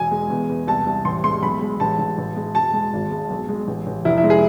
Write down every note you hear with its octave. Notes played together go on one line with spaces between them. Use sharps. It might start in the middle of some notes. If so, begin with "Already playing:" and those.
Already playing: E1 G#5
G#3
E2
E2
C2 A5
C2
A1 C6
G#3 C6
B1 B5
G#3
A1 A5
A1
A1
G#3
E1 A5
G#3
G#1
G#3
B1
G#3
A1
A1
F1 E4
E4
G#3
G#4